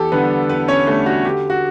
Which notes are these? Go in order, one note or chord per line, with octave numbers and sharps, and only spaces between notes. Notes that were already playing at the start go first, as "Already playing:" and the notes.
Already playing: E2 G4 A4
D3 G3 B3 D4 B4
E2 B3 B4
C#4 C#5
D3 G3 A3 D4 A4
F#4
D3 G4
F#4